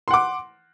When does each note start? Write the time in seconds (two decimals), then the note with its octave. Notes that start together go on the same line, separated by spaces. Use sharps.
0.08 C6
0.11 F#5
0.14 D6